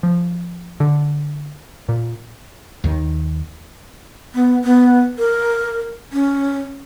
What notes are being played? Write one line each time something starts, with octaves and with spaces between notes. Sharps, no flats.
F3
D3
A#2
D#2 D#3
B3
B3
A#4
C#4